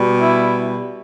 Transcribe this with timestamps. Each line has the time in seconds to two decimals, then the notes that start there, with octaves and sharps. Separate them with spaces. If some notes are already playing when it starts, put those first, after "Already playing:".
Already playing: B2 G3
0.20 E4